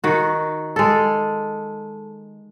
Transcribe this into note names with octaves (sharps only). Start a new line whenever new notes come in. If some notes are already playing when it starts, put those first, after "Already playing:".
D#3 F#4
G#3 A4